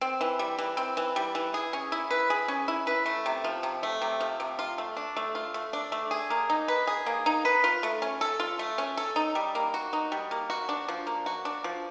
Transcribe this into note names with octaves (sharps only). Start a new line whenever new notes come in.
C4
E3
G3
E3
C4
E3
G3
E3
G#4
C#4
E4
B4
G#4
C#4
E4
B4
A3
C3
F3
C3
A3
C3
F3
C3
F4
A3
D4
A3
F4
A3
D4
A3
G#4
A#3
D#4
B4
G#4
A#3
D#4
B4
F4
A3
C#4
A4
F4
A3
C#4
A4
D#4
G3
A#3
F#4
D#4
G3
A#3
F#4
D4
F3
A#3
F#4
D4
F3